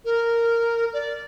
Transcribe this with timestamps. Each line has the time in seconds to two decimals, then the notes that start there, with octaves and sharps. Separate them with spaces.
0.05 A#4
0.93 D5